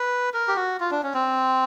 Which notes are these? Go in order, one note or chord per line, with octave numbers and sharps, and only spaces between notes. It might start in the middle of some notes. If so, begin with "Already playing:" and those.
Already playing: B4
A#4
G4
F#4
F4
D4
C#4
C4